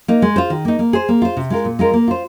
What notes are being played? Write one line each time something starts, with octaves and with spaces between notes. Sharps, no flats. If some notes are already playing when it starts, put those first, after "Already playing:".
A#3 D#4
G#3
F4 C5
D#3
A#3 D#4
A#3
G#4 C5
A#3
F4 C5
C3
G#3 F4 A#4
A#2
G#3 F4 A#4
A#3
F4 C5